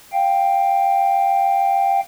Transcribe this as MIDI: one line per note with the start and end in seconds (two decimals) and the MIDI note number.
0.12 2.00 77
0.12 2.00 79